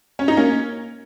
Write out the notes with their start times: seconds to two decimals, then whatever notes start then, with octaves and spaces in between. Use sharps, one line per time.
0.19 C#4
0.28 D#4
0.37 A#3 C#4